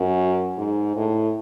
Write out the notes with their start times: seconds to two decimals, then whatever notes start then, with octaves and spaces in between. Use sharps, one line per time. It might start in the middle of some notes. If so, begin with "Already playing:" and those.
Already playing: F#2
0.57 G#2
0.96 A2